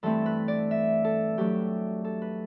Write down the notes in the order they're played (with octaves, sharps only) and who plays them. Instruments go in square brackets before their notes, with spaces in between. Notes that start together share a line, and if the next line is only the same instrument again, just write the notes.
[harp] G2 E3 A3 C4 E4 A4
B4
D5
E5
A4
G2 F#3 A3 D4 G4
A4
B4